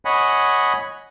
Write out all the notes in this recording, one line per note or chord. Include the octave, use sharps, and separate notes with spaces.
C#5 D#5 F#5 G#5 B5